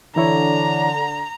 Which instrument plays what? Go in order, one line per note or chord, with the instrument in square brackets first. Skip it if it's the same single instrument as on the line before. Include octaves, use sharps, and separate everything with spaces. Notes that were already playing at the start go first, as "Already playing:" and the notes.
[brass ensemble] D3 [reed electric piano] E3 E4 C#5 [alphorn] D4 [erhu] A#5